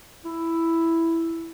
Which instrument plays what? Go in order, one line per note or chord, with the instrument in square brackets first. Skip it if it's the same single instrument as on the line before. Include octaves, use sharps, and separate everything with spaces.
[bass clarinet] E4